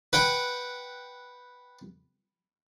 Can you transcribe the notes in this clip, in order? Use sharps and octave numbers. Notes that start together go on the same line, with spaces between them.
B4 F#5 G5